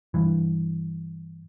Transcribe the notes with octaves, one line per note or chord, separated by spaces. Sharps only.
G2 E3